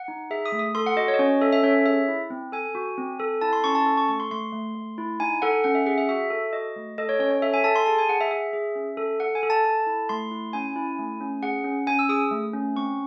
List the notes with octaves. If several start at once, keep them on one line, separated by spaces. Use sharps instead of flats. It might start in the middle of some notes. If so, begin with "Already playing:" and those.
Already playing: F#5
D#4
G#4 E5
D#6
A3
D#6
A4 C6
F#5
F#4 D#5
C#5
D#5
C#4 C#5
A4 E5
E5
C#4 C#5
C#5
G#4 E5
E4
C4
A4 G#5
F#4
C4
A4
E4 A5
C6
C#4 C#6
A5
A4
C#6
A3 C#6
C6
A3 C6
A3
A3
E4
D#4 G#5
A4 F#5
C#4 F#5
E5
G#4 F#5
E5
F#4 E5
A4
F#4 D#5
A3
A4 D#5
C#5
C#4 C#5
C#5
A4 E5
G#5
A4 A5
C6
G#4 A5
G#5
G#4 F#5
E5
G#4 E5
G#4
C#4
A4
A4 F#5
G#5
A4
A5
A4
E4
A3 C6
E4
C#4 G#5
E4
A3
C#4
G#4 F#5
C#4
C#4 G#5
E6
G#4 D#6
A3
C#4
C4 C#6